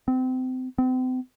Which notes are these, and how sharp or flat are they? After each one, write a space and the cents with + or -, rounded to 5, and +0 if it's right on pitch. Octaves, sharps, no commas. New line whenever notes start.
C4 -30
C4 -40